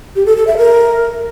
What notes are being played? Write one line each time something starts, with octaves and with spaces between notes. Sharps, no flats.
G4
A4
A4
E5
A#4